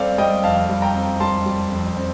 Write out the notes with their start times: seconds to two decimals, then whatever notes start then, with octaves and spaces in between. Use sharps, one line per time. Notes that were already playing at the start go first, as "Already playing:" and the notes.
Already playing: G3 C4 A4 C5 D5 F5
0.18 G3 D#5 G5
0.44 F2 F5 A5
0.70 G3
0.82 G5 A#5
0.95 C4
1.20 G3 A5 C6
1.46 G3
1.72 F2
1.97 C4